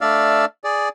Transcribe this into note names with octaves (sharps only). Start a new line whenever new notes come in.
A3 D4 D5 E5 F5
G#4 D5